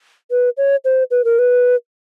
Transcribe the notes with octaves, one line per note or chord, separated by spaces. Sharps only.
B4
C#5
C5
B4
A#4
B4